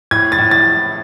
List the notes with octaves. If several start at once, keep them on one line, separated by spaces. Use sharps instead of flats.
A2 G#6
A6
A2
A6